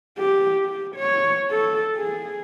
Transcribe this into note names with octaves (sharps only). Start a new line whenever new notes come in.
G4
G4
C#5
A4
G#4